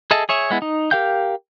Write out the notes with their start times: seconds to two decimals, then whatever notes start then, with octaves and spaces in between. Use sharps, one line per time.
0.11 G#4 A4 D#5 E5 A5
0.29 G#4 C#5 E5
0.50 G#3 B3 E4
0.62 D#4
0.91 G4 A#4 F5 G5 G6